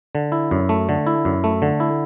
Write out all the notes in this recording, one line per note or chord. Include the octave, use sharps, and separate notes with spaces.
D3
E4
F#2
A3
D3
E4
F#2
A3
D3
E4